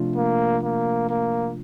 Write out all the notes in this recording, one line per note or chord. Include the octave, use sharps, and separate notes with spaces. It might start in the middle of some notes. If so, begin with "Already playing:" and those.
Already playing: C3 F3 A3 D4 F4
A#3
A#3
A#3